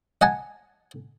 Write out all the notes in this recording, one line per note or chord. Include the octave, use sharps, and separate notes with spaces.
D#5 F#5 G#5 A5